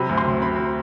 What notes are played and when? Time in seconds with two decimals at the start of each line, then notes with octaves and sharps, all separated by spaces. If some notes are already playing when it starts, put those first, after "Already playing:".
Already playing: C3 F#3 B5
0.09 D2
0.17 C6
0.26 C3
0.42 C4 B5
0.59 F#3